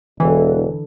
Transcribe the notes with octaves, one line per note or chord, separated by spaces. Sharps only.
E1 D3 E3